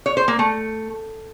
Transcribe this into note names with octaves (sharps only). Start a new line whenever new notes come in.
C#5
C5
A#3
A3